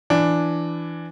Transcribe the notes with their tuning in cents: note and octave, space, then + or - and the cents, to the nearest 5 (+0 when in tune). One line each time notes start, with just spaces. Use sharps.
E3 +15 D4 +0